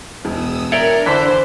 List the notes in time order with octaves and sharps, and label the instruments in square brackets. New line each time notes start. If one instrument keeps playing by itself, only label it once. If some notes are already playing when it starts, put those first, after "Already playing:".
[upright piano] E1 [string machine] D#6 E6
[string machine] D4 [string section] A#4 [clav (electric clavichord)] C#5 D5 G5 [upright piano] E5
[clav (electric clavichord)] D3 E3 [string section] C5 [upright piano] B6